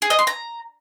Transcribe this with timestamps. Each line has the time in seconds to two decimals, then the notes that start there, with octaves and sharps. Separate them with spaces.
0.02 G#4
0.10 D#5
0.19 C6
0.27 A#5